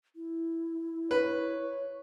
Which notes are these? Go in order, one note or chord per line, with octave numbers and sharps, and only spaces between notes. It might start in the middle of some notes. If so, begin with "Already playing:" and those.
E4
B4 C#5